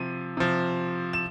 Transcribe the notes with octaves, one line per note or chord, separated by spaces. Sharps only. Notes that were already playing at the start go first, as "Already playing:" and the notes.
Already playing: C3 F3 D#7
C3 F3
E7